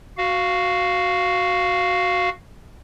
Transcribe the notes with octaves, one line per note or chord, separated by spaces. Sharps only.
F#4 F5